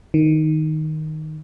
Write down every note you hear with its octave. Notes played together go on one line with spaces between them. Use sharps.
D#3